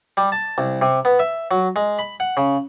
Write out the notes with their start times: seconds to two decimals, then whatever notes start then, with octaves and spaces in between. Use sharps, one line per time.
0.17 G3
0.32 A5
0.58 C2
0.82 C3
1.05 B3
1.19 E5
1.51 F#3
1.76 G#3
1.99 B5
2.20 F#5
2.37 C#3